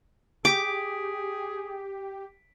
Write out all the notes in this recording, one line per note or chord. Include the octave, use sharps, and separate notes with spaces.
G4 G#4 D6 B6 D7